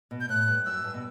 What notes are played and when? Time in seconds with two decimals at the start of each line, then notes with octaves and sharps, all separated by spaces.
0.11 B2
0.20 G6
0.29 A2 F#6
0.48 G2
0.66 F#2 E6
0.84 G2
0.94 B2